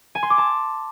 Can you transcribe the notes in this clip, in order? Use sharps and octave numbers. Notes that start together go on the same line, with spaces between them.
G#5
C6
D6
A5